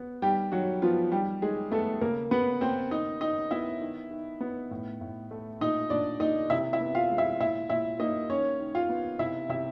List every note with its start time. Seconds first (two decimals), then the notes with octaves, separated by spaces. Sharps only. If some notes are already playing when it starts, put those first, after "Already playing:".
Already playing: B3
0.22 D#3 G3 G4
0.52 D#3 F#3 F#4
0.82 F3 B3 F4
1.12 D#3 G3 G4
1.42 D#3 G#3 G#4
1.71 A3 B3 A4
2.01 C#3 A#3 A#4
2.31 C#3 B3 B4
2.61 A#3 C4 C5
2.91 D#3 D#4 D#5
3.21 D#3 D#4 D#5
3.51 B3 E4 E5
3.81 D#3
4.11 D#3
4.41 B3
4.71 A2
5.01 A2
5.31 A3
5.61 A#2 D#4 D#5
5.90 A#2 D4 D5
6.20 A#3 D#4 D#5
6.50 C3 E4 E5
6.73 E4 E5
6.80 B3
6.95 F4 F5
7.11 G#3
7.18 E4 E5
7.40 A#2 E4 E5
7.70 A#2 E4 E5
7.99 A#3 D#4 D#5
8.30 D#3 C#4 C#5
8.60 D#3
8.75 F4 F5
8.89 B3
9.19 C3 E4 E5
9.49 C3 E4 E5